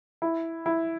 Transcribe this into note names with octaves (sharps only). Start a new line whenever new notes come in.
E4
E4